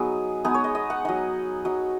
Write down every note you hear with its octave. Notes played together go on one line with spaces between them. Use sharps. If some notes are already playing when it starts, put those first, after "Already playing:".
Already playing: F#3 B3 D#4 G#4
G#3 B3 D#4 G#4
C#5
D#5
D#5
F#5
F#3 D#4 D#5
F#3 D#4